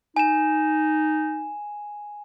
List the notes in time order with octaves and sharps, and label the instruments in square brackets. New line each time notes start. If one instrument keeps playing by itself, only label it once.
[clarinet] D#4 [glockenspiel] G#5 E7